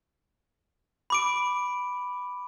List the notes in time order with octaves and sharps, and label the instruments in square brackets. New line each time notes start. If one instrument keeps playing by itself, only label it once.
[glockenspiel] B5 D6 D7